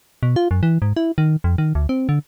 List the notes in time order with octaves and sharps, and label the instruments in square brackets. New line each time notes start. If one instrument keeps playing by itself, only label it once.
[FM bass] B2
F4
F#2
E3
G#2
E4
D#3
F2
D#3
D2
C4
D3